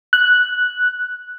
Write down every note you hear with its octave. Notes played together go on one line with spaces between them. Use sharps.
F#6